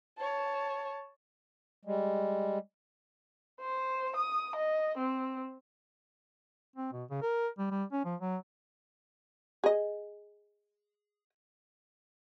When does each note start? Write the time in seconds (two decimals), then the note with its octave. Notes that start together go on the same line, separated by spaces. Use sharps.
0.19 C#5 A5
1.85 G3 G#3
3.61 C5
4.16 D#6
4.56 D#5
4.98 C4
6.76 C4
6.93 B2
7.10 C#3
7.22 A#4
7.58 G3
7.71 G3
7.92 C#4
8.05 F3
8.21 F#3
9.64 G#4 D#5